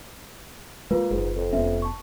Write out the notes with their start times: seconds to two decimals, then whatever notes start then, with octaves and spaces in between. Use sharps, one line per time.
0.91 G#3 A#3 F4 B4
1.10 F#1 G#2
1.36 F2
1.53 F1 B3 C#4 E5
1.82 A5 C#6